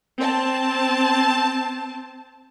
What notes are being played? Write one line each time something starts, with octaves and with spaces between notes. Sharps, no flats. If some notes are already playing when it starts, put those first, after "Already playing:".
C4 A5